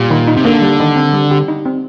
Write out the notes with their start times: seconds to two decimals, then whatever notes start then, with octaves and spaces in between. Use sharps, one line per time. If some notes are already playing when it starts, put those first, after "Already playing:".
Already playing: A#2 G3
0.11 D#3
0.27 D#4
0.37 C3
0.45 D3 A#3
0.62 G3
0.80 D#3
0.96 C4
1.13 G3
1.31 G4
1.48 D#4
1.65 C4